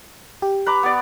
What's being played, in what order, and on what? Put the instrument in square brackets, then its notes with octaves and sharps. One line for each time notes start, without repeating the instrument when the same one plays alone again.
[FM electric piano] G4
[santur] B4 A#5 D6
B3 D5